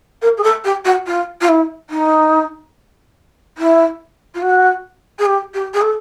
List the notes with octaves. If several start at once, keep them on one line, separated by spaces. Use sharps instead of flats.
A#4
G#4
A4
G4
F#4
F4
F4
E4
D#4
E4
F4
F#4
G#4
G4
G4
G#4
A4